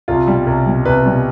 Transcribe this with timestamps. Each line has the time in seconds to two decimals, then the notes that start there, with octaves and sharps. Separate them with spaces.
0.08 C2 F4
0.27 B2 G3
0.47 C2
0.66 B2 G3
0.85 C2 B4
1.06 B2 G3